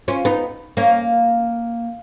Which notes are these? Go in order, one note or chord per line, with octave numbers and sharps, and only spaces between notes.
C#4 F4
B3 D#4
A#3 C#4